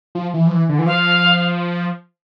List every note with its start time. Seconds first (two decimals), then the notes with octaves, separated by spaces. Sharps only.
0.15 F3
0.34 E3
0.47 F3
0.52 E3
0.69 D3
0.79 E3
0.86 F3 F5